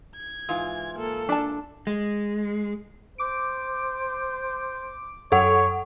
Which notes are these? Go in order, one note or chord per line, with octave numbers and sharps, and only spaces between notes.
G#6
G#2 E3 F4
A#3 A4
D4 A5
G#3
C5 D6 D7
F#2 A4 C#5 F#5